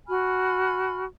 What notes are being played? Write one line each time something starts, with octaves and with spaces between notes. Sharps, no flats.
F#4 G#5 B5 F6